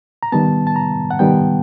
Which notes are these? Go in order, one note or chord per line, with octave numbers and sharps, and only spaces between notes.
A#5
D#3 G3 B3 A5
A5
A#5
F#5
D#3 G3 B3 G5